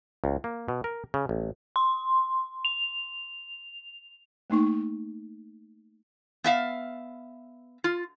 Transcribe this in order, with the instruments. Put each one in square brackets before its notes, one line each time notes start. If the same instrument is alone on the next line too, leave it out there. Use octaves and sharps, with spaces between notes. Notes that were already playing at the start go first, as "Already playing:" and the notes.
[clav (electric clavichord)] C#2
A#3
B2
A#4
C#3
A1
[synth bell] C6
F7
[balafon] A3 A#3 D#4 C#6
[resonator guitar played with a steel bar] B3 E5 F5
F4